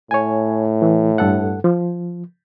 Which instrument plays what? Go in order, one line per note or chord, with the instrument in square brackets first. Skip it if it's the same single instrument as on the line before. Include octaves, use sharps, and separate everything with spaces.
[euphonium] A2 [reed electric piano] C#5 G#5
[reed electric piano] E3
G2 A4 F#5
F3